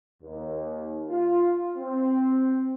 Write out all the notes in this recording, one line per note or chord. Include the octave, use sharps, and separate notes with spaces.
D#2
F4
C4